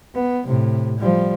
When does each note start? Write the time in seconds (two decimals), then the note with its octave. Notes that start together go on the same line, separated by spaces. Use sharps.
0.15 B3
0.46 A2 C3
0.99 F3 G3